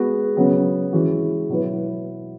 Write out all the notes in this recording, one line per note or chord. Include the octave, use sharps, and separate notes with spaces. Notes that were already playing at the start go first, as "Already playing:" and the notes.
Already playing: G#3 B3 F#4
C#3 F#3 B3
E3 G#3 C#4 F#4
B2 F#3 E4 B4